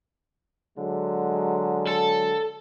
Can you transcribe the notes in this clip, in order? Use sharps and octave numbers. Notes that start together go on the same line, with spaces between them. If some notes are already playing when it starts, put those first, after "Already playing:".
D3 F#3 G#3
A4